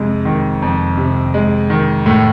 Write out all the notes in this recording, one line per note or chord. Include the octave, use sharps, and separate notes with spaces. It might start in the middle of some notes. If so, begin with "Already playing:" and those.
Already playing: F2 C3 G#3
D#3
F2
C3
G#3
D#3
A2